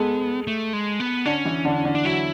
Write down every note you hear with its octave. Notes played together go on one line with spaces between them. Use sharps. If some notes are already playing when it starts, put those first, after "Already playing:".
Already playing: G#3 B3 G#4 A4
A3
G#3
B3
D3 C#4 D4
E3 E4
D3 D4
D3 D4
D4
F#3 E4 F#4